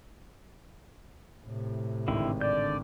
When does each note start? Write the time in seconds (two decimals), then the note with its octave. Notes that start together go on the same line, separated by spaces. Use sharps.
1.45 A2 C3
2.08 G#1 D3 C4 E4
2.41 D3 D5 G6